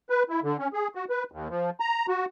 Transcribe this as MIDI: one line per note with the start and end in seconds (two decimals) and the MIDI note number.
0.10 0.23 71
0.29 0.40 64
0.43 0.57 50
0.59 0.68 61
0.73 0.88 68
0.95 1.05 66
1.10 1.23 71
1.32 1.48 39
1.50 1.70 53
1.80 2.06 82
2.08 2.25 66